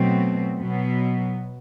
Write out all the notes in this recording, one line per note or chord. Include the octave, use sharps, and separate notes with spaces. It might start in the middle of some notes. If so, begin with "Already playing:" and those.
Already playing: B2 F#3 A3 C4
B2 F#3 B3